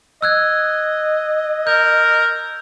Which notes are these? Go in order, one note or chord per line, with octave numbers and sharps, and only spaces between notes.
D#5 E6 F#6 G#6
A#4 G6